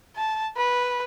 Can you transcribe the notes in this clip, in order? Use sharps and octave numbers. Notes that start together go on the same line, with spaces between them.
A5
B4